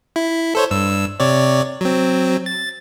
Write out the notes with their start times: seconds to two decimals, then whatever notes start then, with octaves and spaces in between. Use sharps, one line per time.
0.16 E4
0.55 A4 C5 C#5
0.71 G2 E6
1.20 C3 C#5 D5
1.81 F#3 C4
2.46 A6